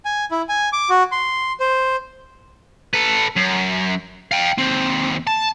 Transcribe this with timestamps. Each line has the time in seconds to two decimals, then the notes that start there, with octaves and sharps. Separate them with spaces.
0.05 G#5
0.31 E4
0.49 G#5
0.73 D6
0.90 F#4
1.12 C6
1.60 C5
2.93 A4 B4
3.37 F#2
4.31 F5 G5
4.58 D#2 C4
5.27 A5